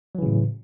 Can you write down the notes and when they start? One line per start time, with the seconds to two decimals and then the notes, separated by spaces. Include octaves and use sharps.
0.15 F#3
0.18 E3
0.22 C#3
0.26 A2